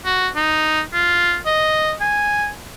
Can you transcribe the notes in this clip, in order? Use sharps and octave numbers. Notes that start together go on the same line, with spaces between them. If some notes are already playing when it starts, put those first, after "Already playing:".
F#4
D#4
F4
D#5
G#5